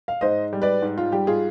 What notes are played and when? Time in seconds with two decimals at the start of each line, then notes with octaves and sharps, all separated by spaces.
0.08 F5
0.21 G#2 C5 D#5
0.53 G3
0.62 B4 D5
0.82 G#2
0.98 F4
1.12 G3 G4
1.27 F4 G#4